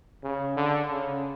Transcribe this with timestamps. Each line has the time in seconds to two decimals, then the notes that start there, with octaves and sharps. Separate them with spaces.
0.24 C#3
0.57 D3
0.91 C#3